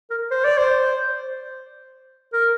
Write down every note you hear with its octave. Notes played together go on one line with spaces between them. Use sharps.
A#4
C5
D5
C5
A#4